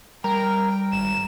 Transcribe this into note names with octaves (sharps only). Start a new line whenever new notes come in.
G3 A#4 G5 A#5
G#1 E7